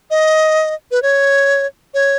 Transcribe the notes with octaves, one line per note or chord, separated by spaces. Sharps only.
D#5
B4
C#5
C#5